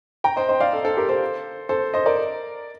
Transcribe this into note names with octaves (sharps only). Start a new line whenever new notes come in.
G5 A#5
C5 D#5
C5 D#5
D5 F5
A4
A4
G4 A#4
A4 C5
A4 C5
C5 D#5
A#4 D5